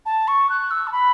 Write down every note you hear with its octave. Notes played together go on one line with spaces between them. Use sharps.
A5
C#6
F#6
E6
A5
B5